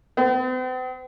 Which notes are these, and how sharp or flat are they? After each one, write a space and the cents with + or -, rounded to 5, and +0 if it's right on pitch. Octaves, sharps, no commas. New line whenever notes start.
C4 -45